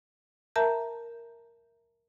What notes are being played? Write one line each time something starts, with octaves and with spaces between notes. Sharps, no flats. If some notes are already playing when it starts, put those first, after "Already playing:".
A#4 E5 A5 A#5 G6